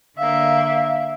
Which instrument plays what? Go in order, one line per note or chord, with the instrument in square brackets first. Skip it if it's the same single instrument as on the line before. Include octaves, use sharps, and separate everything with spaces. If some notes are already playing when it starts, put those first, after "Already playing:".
[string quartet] D3 A#3 [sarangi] E5 [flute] F5